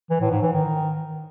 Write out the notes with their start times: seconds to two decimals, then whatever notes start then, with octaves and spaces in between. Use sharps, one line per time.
0.11 E3
0.21 A2
0.32 G#2
0.42 E3
0.53 D#3